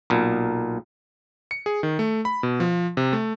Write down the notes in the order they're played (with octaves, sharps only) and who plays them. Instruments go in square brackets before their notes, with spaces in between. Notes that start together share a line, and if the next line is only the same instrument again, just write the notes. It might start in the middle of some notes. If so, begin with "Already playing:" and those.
[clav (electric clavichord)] B1 A#2
[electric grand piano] C#7
G#4
D#3
A3
B5
B2
F3
C3
A3